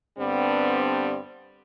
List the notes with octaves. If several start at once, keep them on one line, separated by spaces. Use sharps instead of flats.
G2 D3 G3 B3 C4